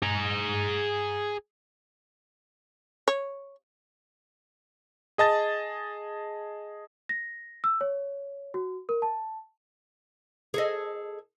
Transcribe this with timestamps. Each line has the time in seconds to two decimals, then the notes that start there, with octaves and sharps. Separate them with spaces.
0.02 G#4 A#5
3.08 C#5
5.18 G#4 D#5 A5 A6
7.09 A#6
7.64 E6
7.81 C#5
8.54 F#4
8.89 A#4
9.02 A5
10.54 G#4 A4 D#5